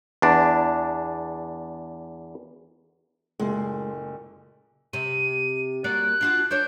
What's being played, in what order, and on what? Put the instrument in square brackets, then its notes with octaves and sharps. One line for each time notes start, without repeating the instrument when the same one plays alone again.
[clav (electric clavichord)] E2 D4
[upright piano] F#1 A#2 A3 [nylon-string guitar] G#3
[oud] C3 [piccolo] D#7
[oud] A#3 F#4 D5 [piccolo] F#6
[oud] D4 F4 F#4
[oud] D4 C5 C#5 [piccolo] G6